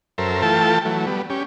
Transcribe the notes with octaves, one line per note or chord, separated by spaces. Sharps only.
F#2 A4 A#4 C5 E5
E3 A3 F4 A4 G5 A5
E3 F#3 A3
G3 B3
C#4 G4